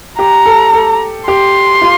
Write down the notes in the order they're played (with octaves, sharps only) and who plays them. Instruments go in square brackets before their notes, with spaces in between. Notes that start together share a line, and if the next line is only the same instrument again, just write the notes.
[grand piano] G4 [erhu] A#5
[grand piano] A4
A4
[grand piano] G4 [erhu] C6
[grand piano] F4